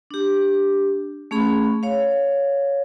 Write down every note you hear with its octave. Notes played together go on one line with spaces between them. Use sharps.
D4 G4
A3 C#4 G#4 B5
C#5 F5